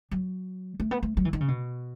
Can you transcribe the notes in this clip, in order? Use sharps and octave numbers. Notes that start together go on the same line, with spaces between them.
F#3
A3
B3
A3
F#3
E3
D#3
C#3
B2